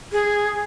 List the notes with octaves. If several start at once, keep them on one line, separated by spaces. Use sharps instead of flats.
G#4